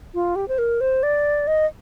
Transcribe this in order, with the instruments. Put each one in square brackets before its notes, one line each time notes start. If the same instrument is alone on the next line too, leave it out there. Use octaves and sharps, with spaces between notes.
[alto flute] F4
G4
C5
A#4
C5
D5
D#5